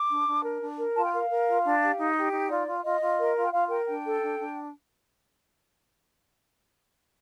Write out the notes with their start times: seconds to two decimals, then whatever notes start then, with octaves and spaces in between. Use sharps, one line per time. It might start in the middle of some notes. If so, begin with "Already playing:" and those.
Already playing: D6
0.10 D4
0.27 D4
0.44 A#4
0.61 D4
0.78 A#4
0.95 F4 A5
1.04 G5
1.12 A#4 F5
1.30 A#4
1.46 F4
1.64 D4
1.81 G4
1.98 D#4
2.16 G4
2.32 D#4
2.50 F4 D5
2.67 F4
2.84 F4 D#5
3.01 F4
3.18 A#4
3.35 F4
3.45 G5
3.52 F4 F5
3.69 A#4 G5
3.87 D4 G5
4.04 A4
4.21 D4
4.38 D4